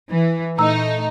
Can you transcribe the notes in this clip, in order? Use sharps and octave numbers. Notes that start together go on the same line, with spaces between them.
E3
A#2 A3 D#4 A#5 E6